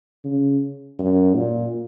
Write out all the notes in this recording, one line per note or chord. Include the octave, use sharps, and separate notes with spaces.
C#3
F#2
A#2